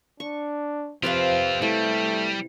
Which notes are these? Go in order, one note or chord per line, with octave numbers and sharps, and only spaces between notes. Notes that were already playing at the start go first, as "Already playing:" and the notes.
D4 C#6
C3 F3 C4 F4 B4 F5
G3 A3 E4